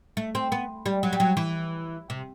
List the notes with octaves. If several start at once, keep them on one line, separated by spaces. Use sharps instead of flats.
A3
C4
B3
G3
F#3
G3
F#3
E3
C3